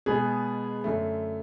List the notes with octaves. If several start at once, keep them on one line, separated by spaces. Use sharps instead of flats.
B2 G#3 B3 G#4
F#2 D3 A3